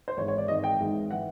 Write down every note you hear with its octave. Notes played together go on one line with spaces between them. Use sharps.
C5
G#1 G#2 E3 C#5
C#5
D5
G#1 G#2 E3 D#5
G5
G#1 G#2 E3
E3 F#5